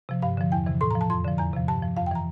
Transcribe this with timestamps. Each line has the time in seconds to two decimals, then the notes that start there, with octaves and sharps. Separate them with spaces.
0.09 C3 F3
0.22 G2 F5
0.37 D3 F3
0.52 E2 G5
0.66 C3 E3
0.81 A2 C6
0.91 A#5
0.95 F3
1.01 A5
1.10 F2 C6
1.25 D3 F3
1.38 E2 A#5
1.53 C3 F3
1.68 G2 A5
1.82 F3
1.97 F2 F5
2.06 G5
2.11 E3 A#5